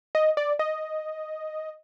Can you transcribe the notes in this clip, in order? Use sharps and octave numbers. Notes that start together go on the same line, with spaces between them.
D#5
D5
D#5